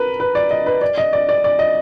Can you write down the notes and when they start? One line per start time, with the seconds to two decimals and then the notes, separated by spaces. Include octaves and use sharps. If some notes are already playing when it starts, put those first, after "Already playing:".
Already playing: A#4 B4
0.20 B4
0.35 D5
0.51 D#5
0.66 B4
0.81 D5
0.98 D#5
1.13 D5
1.29 D5
1.44 D5
1.59 D#5